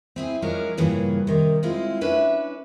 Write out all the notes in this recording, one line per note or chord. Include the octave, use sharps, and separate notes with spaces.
C4 E4 G#4
F3 F#3 G#3 C#4 D4 A#4
G2 A#2 C#3 E3 G#4
C3 D#3
G#3 C4 E4 F4
C#4 D4 B4 E5